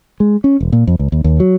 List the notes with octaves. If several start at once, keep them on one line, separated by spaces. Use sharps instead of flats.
G#3
C#4
E1
A#2
F2
C#2
D#2
D#2
F#3